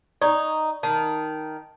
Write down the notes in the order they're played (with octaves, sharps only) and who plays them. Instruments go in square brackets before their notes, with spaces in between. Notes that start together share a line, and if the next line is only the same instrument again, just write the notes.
[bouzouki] D#4 [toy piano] D5 C#6
[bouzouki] D#3 [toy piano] A5